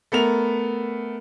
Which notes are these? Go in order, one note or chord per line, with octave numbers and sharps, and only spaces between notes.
A3 B3 A#4 F7